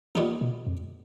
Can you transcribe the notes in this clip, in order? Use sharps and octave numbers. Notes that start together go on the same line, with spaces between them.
A#2 E3 G3 B3 D#4
B2
F2